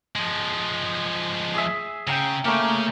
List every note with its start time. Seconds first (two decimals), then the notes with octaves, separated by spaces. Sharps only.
0.16 F3 G#3
1.55 G#4 E5
2.07 C#3 G5 A#5
2.45 C#3 A3 A#3